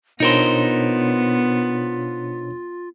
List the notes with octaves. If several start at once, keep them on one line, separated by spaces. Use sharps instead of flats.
B2 B3 D4 D#4 F4 A#4 C5 C#5